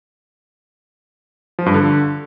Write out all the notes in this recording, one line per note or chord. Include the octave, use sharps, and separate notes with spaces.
F3
G2
D3